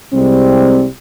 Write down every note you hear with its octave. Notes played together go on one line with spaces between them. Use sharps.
C2 G3 G#3 C4